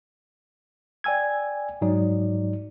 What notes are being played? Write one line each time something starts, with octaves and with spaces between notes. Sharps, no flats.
D5 G5 G#5 E6 G#6
G#2 F#3 D#4 D5